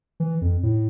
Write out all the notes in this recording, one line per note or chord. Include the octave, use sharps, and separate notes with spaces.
E3
F2
A2